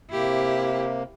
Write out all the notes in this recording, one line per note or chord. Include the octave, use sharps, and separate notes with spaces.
C3 A#3 E4 G4